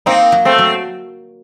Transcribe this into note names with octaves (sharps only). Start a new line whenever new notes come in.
A#3 C4 D#4
F#3
A3 C4
F#3